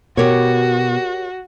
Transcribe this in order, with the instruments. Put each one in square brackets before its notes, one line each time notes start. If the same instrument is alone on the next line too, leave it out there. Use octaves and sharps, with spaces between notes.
[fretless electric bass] B2 [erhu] F#4 [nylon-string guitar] G4 A#4 C#5